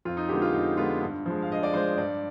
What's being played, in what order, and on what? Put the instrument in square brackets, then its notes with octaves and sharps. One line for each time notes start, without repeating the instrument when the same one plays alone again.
[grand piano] F2 F4
D#4
D3 G#3 B3 G4
F4
F2 D#4
D3 G#3 B3 F4
G2
F3 G#3
F5
G2 D#5
D5
F3 G#3 C5
G2 D5